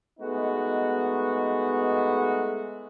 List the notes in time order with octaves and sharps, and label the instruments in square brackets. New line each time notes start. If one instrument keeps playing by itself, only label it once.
[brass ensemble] G#3 A3 B3 D#4 F#4